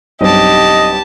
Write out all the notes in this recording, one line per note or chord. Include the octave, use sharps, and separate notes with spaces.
B1 G2 C4 G4 D#5 A5